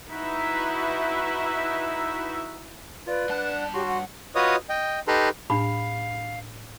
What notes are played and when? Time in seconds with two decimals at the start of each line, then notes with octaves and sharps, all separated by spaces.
0.10 D#4 E4 F#4 B4 E5
3.07 F4 B4 D5
3.29 G2 D4 F#5 A5
3.74 F#4 G4 C#5 C6
3.87 F#5
4.35 F4 F#4 B4 C#5 D#5 D#6
4.69 D#5 G5
5.08 D#4 G4 A4 B4 A#5 C6
5.50 A2 D4 F5 B5